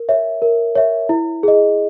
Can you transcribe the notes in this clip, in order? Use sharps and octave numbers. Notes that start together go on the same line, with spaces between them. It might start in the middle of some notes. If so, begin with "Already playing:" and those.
Already playing: A#4
C#5 E5
A#4
C#5 E5
E4
G#4 D#5